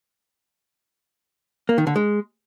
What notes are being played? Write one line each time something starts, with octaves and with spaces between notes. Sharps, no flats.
A#3
D#3
D3
G#3